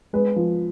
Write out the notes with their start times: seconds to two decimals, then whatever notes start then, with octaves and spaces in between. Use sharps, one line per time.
0.13 G#3 B4
0.36 F3